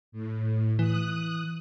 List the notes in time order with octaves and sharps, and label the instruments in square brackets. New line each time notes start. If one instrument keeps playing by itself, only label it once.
[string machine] A2
[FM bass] E3 [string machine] D#6 F#6